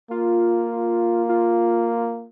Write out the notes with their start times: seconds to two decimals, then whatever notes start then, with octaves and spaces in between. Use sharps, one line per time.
0.11 A#3 F4
1.29 F4